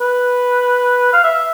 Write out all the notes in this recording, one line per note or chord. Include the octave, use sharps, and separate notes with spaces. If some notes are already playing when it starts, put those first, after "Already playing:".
B4
F5
E5